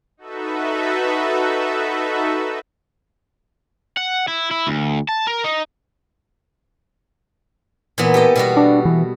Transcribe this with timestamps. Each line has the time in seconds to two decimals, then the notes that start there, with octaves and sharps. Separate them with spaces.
0.17 D#4 F#4 A4 B4 E5
3.97 F#5
4.28 E4
4.51 E4
4.67 D2
5.09 A5
5.27 A#4
5.44 D#4
7.98 A#2 E3 B3
8.14 G4 A4 D#5
8.36 B2 G3 F#4
8.57 D4
8.85 E3